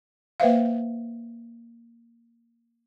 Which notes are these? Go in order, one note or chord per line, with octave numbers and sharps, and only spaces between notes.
A#3 B4 C5 E5 F5